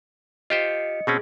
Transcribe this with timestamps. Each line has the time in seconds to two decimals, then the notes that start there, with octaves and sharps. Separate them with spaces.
0.50 F4 G4 C5 D#5 C#7
1.07 B2 C4 C#4 G#4